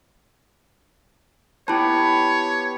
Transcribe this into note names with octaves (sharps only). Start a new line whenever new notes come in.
B3 E4 G4 B4 C#5 A5